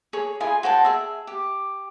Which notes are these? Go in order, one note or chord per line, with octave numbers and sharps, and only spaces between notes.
G#4 C#5
E4 F4 G#4 G#5
F#4 C5 G5 A5
G#4 E5
G4